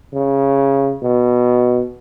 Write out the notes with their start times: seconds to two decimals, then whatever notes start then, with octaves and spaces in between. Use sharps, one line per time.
0.14 C#3
1.02 B2